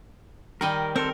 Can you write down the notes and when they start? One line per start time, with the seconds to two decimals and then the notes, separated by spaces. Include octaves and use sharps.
0.61 D#3 G3 A#4 D#5
0.96 C4 A4 A#4 C5